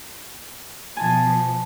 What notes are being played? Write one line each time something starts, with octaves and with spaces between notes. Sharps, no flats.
B2 F3 G#5 A5